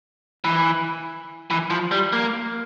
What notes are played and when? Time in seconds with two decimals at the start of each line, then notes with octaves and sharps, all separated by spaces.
0.44 E3
1.51 E3
1.70 F3
1.91 G3
2.13 A#3